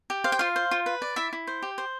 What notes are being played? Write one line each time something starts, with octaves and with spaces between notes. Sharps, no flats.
G4
C5 F5
G5
F4 F5
C5
F4
B4
D5
E4 E5
E4
C5
G4
C5